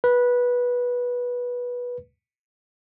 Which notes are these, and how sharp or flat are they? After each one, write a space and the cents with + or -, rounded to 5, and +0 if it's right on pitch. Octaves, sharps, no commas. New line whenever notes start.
B4 -15